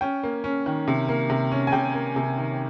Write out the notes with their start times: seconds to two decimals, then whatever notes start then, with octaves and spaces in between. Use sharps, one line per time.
0.01 C#4 G5
0.23 A#3
0.44 C#4
0.66 D#3
0.88 C3
1.08 A#3
1.30 C3
1.51 C#4
1.67 G#5
1.72 C3 G5
1.94 A#3
2.16 C3
2.38 D#3